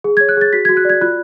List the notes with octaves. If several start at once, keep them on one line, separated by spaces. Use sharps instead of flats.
G#4
G#6
C#5
F#6
G#4 A6
F#4 B6
G#6
F#4
F#6
D5 G#6
F4 F#6